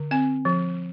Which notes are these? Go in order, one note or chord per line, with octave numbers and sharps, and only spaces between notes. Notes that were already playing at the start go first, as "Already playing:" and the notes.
Already playing: D3
C4 G#5
F3